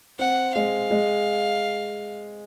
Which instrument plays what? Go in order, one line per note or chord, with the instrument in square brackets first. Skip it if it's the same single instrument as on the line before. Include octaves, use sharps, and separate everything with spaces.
[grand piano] C4 [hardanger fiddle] F#5
[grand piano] G#3 [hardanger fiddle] F5
[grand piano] G#3